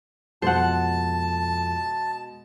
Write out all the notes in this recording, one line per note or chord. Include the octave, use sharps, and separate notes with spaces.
F2 B2 G#3 C5 F#5 A5